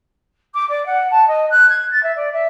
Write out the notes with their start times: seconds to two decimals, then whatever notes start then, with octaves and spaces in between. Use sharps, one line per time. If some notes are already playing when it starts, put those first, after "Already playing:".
0.54 D6
0.69 D5
0.85 F#5
1.10 A5
1.27 D#5
1.50 F#6
1.69 G#6
1.90 A6
2.03 E5
2.15 D5
2.32 E5